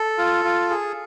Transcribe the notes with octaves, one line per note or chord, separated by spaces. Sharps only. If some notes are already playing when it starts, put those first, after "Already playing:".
Already playing: A4
F4
F4
G#4